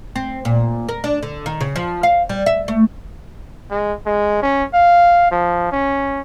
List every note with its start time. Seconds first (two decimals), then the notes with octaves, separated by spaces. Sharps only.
0.16 C4
0.45 A#2
0.89 A#4
1.04 D4
1.23 D3
1.46 D#3
1.61 C#3
1.76 F3
2.03 F5
2.29 G3
2.46 E5
2.68 A3
3.71 G#3
4.06 G#3
4.42 C#4
4.74 F5
5.31 F3
5.72 C#4